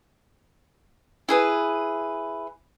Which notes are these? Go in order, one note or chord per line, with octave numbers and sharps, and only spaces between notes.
E4 G#4 B4